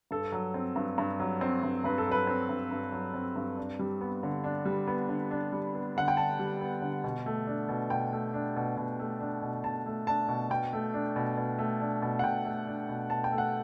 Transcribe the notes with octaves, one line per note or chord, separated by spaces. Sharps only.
G2 A4
F#3
C4
G2
G2
F#3
C4
G2
G2 B4
A4
F#3 B4
C4
G2
G2
F#3
C4
G2
D4
G3
B3
D3
D4
G3
B3
D3
D4
G3
B3
D3 F#5
G5
D4 A5
G3
B3
D3
B2
A3
D4
B2
B2 G5
A3
D4
B2
B2
A3
D4
B2
B2 A5
A3
D4 A5
B2
B2 G5
A3
D4
B2
B2
A3
D4
B2
F#5
B2 G5
A3
D4
B2
B2 A5
G5
A3
F#5